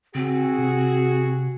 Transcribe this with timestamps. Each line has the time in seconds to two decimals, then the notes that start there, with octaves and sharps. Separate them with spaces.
0.15 C#3 C4 F#4 G#4
0.59 C3